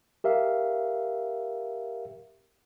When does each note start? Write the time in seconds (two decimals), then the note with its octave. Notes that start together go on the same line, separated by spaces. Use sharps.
0.24 G4 A#4 E5 F5